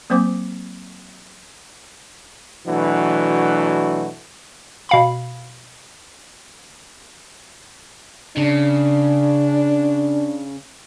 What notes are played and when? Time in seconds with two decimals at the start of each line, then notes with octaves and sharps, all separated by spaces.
0.10 F#3 A#3 C4 C5 D6
2.67 B2 E3 F#3 A3 D4 F#4
4.89 B2 F5 B5
8.37 C#3 D4